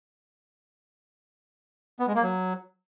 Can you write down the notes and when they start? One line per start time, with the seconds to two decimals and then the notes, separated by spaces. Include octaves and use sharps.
2.00 B3
2.07 G#3
2.15 A#3
2.23 F#3